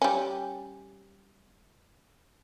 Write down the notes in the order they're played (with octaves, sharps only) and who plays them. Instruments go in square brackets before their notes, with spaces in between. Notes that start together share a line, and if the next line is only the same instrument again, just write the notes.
[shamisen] G3 C#4